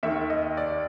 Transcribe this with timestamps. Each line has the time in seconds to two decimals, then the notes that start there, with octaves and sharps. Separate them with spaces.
0.03 D#2 D#3 E5
0.30 D#5
0.57 D5